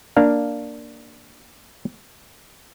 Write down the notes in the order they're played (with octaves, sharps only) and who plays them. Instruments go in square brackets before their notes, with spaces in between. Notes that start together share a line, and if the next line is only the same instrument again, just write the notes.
[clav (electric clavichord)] A#3 D4 F5